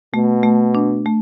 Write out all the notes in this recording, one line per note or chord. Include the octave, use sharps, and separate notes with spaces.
B2 A3
A3
D4
A3